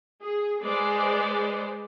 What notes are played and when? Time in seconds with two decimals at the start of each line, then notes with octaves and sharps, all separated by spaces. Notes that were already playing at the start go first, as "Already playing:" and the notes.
0.19 G#4
0.61 G#3 B4 C5 D5